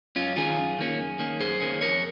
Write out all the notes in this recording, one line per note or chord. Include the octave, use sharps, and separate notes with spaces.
F#2 C#4 F4
D#3 A#3 C#4 F4 G#4
F#2
D#3 A#3 C#4
F#2
D#3 A#3 C#4
F#2 G#4 C5
D#3 A#3 C#4
F2 A#4 C#5